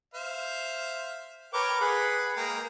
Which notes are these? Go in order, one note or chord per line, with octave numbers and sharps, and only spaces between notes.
C5 E5 F5
A#4 B4 C#5 G5 D6
G#4 B4 F#5 B5
G#3 A#3 G5 A#5